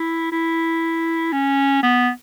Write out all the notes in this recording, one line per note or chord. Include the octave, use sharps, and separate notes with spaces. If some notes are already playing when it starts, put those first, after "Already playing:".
Already playing: E4
E4
C#4
B3